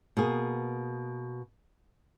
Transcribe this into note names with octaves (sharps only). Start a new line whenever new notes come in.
B2 A#3 G#4